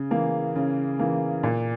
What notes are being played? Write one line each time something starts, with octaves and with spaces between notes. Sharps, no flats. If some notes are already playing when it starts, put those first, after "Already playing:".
Already playing: C#3
E3 A#3
C#3
E3 A#3
A#2